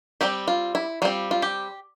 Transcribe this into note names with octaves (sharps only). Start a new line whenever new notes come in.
G3 C4 G4
F4
E4
G3 C4 F4
F4
G4